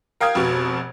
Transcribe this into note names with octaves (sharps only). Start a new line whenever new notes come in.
A#4 F5 G5 D#6 G#6
F1 B2